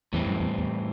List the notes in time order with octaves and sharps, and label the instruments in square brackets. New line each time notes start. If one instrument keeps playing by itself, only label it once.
[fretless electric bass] E2 [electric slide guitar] A2 E3 G3 C4
[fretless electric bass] F#2
E2
E2